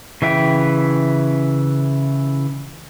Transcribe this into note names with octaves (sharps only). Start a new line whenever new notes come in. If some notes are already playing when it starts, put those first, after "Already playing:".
C#3 E3 E5 G5